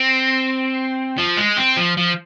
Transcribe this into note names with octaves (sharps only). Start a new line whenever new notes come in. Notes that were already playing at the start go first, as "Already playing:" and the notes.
Already playing: C4
F3
G#3
C4
F3
F3